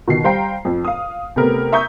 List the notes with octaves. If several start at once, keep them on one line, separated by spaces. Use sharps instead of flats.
B2 D#3 C7
G3 C5 F5 G5 A#5 C7
F2
F5 D#6
C3 A3 B3 A#4
E5 A#5 C#6 D#6 G6